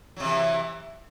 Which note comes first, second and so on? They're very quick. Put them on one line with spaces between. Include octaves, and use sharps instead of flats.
F#3 C3 E3